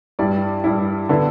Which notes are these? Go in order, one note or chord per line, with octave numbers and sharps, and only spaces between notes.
G2 G3 E4 D5
G2 G3 E4
D3 B3 E4